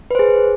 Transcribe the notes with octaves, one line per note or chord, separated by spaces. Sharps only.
G#4 B4 C5